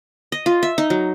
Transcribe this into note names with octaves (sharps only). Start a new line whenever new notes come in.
D#5
F4
E5
D#4
F#3